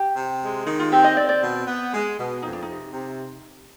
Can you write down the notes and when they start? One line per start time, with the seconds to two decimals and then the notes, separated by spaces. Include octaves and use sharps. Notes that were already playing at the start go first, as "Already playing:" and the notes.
Already playing: G4
0.16 C3
0.42 G#3
0.66 D#3 D#4
0.79 F4
0.92 C4 G4
1.04 D#5
1.17 C4 D5
1.29 D5
1.43 B2
1.67 B3
1.92 G#3
2.18 B2
2.42 F2 D#4
2.53 D4
2.63 D#4
2.68 C3
2.93 C3